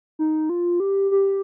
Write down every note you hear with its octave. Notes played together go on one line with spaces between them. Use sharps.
D#4
F4
G4
G4